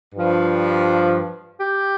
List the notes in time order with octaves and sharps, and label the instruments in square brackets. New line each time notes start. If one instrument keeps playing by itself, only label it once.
[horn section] G2 F3
G4